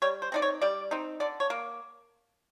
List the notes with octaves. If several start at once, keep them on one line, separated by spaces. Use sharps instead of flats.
G3 C#5
C5
C4 D#4 D5
C#5
G3 D5
C4 D#4
D3 D5
C#5
A#3